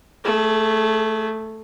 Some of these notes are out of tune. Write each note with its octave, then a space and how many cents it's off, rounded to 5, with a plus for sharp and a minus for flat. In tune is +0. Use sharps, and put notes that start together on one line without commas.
A3 +0 G#4 +25